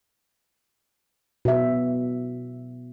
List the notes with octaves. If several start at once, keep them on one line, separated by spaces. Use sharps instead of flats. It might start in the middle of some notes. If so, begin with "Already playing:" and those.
B2 E5